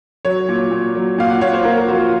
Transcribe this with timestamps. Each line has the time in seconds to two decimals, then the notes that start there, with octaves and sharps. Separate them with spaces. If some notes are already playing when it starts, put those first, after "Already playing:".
0.25 F#3 C#5
0.49 A#2
0.72 A#2
0.95 F#3
1.18 A#2 F5
1.30 F#5
1.41 A#2 C#5
1.53 C5
1.64 A#2 A#4
1.77 A#4
1.88 F3 F#4
1.99 F4